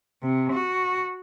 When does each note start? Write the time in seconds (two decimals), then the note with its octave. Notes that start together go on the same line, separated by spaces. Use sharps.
0.22 C3
0.52 F#4